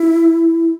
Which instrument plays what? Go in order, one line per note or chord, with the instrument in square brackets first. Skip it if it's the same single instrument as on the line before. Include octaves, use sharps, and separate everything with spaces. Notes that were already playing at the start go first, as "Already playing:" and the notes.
Already playing: [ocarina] E4